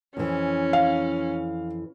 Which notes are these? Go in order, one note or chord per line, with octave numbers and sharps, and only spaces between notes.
F2 E3 C#4
F5